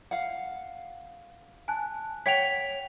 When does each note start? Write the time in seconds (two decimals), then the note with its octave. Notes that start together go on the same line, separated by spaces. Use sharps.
0.11 F5 F#5
1.68 G#5 A5 F#6
2.26 C#5 F#5 G5 B6 F7